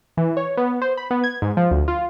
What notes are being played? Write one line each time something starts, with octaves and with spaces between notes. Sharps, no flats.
E3
C#5
B3
C5
B5
B3
G#6
G#2
F3
D2
F4